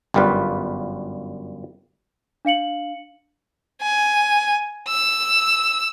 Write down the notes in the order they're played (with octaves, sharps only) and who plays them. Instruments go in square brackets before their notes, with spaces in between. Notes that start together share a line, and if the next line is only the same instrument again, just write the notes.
[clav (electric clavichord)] G1 F#2 G3 F4 B4
[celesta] D4 F5 C#7 F#7
[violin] G#5
E6